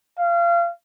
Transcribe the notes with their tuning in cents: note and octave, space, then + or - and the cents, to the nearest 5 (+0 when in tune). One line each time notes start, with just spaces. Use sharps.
F5 -30